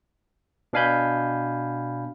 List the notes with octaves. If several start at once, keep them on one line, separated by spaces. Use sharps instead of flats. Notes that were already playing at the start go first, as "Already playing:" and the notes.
B2 D4 F5 G#5 B5 G6